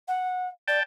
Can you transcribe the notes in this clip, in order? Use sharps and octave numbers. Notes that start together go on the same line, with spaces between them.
F#5
D5 G5 A5